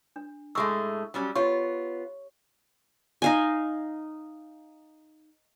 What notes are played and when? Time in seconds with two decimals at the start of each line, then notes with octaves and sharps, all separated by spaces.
0.16 D4
0.55 A2 G#3 A3 C#6 D#6 E6
1.14 F#3 G3 C#4
1.35 B3 F4 G4 C#5 C#6
3.22 D#4 F5 G#5